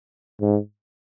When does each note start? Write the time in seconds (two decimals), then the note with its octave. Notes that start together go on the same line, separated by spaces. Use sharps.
0.41 G#2